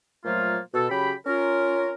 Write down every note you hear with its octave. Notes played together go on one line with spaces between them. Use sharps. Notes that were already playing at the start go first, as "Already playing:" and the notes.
A#2 F3 F#3 A3 A#3 F4
B2 A4
C#3 F#3 G4 G5 B5
C#4 F4 A#4